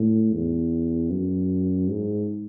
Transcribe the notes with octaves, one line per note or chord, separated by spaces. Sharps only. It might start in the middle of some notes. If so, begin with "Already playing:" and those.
Already playing: A2
E2
F#2
G#2